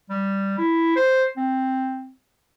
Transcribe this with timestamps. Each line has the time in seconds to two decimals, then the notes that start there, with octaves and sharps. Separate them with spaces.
0.10 G3
0.58 E4
0.96 C5
1.37 C4